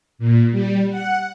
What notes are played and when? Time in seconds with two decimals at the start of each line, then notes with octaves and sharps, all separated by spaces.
0.19 A#2
0.51 G3
0.90 F#5